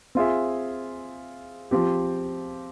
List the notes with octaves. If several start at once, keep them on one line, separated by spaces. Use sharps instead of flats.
C4 F4 G#4 E5
F3 C4 G4